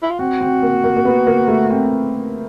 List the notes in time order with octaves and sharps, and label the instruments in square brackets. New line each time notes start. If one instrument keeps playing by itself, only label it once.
[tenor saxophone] E4
F4
[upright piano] C4 [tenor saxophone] F#4
[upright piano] C4
A#3
A#3
A#3
B3
A#3
A3
C4